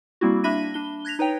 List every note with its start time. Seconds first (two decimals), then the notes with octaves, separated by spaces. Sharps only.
0.21 G3 A#3 C4 E4 F#4
0.44 A#3 D4 E5 B5 A#6 D#7
0.74 D4 G7
1.05 F#6 G#6 A#6 B6 F7
1.19 D#4 B4 C#5 G5